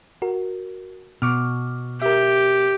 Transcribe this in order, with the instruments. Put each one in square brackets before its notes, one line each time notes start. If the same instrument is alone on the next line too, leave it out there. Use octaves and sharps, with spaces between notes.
[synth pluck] F#4 A#4
[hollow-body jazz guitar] B2 [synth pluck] C#6 D6 F6
[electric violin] G4 [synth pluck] A#4 E5